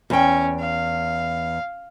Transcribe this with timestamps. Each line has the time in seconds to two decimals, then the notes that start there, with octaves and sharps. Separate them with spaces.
0.10 E2 C#4 G5
0.61 F5